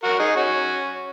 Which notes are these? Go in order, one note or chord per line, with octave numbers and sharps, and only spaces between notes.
F#4 A#4
D#4 G#4
C#4 F#4